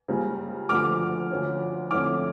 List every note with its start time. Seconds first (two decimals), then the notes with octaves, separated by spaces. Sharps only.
0.08 C#2 C#3 G3 A#3
0.69 D2 D3 F3 A3 D6 F6
1.30 D2 D3 F3 C#4
1.90 F2 D3 A3 C#4 E4 D6 F6